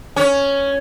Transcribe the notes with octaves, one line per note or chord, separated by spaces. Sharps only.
C#4